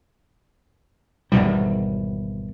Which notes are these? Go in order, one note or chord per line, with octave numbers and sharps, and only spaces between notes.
G#1 E2 B2 G3